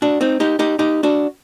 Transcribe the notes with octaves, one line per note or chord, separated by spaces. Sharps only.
D4 F#4
C4 D#4
D#4 G4
D#4 G4
D#4 G4
D4 F#4